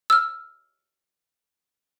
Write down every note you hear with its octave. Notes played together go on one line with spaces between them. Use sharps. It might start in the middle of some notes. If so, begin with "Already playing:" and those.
E6 F6